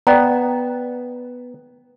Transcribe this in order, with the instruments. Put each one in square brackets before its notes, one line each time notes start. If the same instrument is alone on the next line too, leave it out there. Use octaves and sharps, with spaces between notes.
[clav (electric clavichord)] B3 [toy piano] D5 G5 A#5